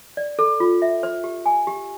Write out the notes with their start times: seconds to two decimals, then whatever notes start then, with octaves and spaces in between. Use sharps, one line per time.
0.17 D5
0.39 A4
0.60 F4
0.82 E5
1.03 C5
1.24 G4
1.46 G#5
1.67 G4